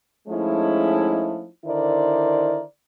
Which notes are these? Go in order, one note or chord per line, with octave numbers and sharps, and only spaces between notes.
F3 G#3 A3 C#4 D#4 E4
D3 D#3 E4 A#4 C5 D5